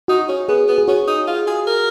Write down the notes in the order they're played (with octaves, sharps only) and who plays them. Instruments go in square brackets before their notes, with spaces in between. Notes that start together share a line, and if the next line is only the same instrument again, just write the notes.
[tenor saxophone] D#4 [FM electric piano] F#4
[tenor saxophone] C#4
[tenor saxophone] B3 [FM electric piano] G#4
[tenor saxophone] B3
[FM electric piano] G#4
[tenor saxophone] C#4 [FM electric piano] F#4
[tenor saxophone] D#4
F4
G#4
A#4